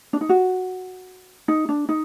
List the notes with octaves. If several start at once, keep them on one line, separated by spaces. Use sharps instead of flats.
D4
D#4
F#4
D#4
D4
D#4